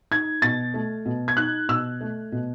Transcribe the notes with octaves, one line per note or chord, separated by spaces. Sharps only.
D#4 G#6
B2 A6
A3
B2
G#6
D#4 F#6
B2 E6
A3
B2